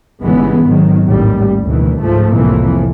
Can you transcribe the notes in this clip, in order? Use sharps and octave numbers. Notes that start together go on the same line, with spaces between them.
G1 C#3 E3 G#3 B3
G#1 G#2 D#3 F#3
A1 D#2 A2 G3
D2 B2 D#3 E3
C#2 G#2 F3 A3
C2 F2 A2 E3 F3 A#3